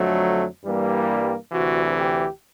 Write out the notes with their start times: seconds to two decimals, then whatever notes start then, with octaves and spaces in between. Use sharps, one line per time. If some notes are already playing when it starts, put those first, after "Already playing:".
Already playing: F2 D3 F#3 A3
0.62 G2 E3 G3 A#3
1.52 D2 C3 E3 F#4
1.97 G4